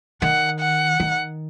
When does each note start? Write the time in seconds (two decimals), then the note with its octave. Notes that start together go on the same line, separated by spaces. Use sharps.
0.22 D#3 F#5
0.60 F#5
1.00 D#3